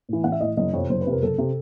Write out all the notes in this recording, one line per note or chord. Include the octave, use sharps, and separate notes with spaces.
A2 E3
A1 F#5
E5
A2 E3 D#5
F#1 D#5
F2 C3 C#5
F#1 C5
B4
F2 C3 A#4
F#1 A4
C3